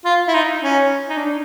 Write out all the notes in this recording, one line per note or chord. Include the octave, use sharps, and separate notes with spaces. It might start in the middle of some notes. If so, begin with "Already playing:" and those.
F4
E4
D#4
C#4
D#4
D4